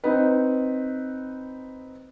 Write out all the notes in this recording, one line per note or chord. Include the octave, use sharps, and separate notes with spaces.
C4 D#4 B4